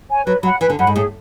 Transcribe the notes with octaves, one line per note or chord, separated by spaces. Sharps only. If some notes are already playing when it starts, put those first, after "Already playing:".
C#5 G#5
F#3 B4
F#3 F#5 B5
E3 B4
D3
F#2 F#5 B5
G#2
A2 G#4